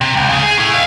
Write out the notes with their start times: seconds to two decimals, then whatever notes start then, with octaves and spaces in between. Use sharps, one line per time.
0.01 C3
0.16 C#2
0.29 C#3 G#3
0.43 G#4
0.58 A2 E4
0.71 E4 F5